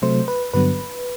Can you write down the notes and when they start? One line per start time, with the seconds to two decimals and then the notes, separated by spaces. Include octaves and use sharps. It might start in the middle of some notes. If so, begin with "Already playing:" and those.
0.02 C3 F#3 A3 C5
0.28 B4
0.54 G2 D3 F#3 B3 B4